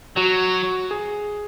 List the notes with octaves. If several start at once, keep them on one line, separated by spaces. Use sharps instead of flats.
F#3 F#4
G#4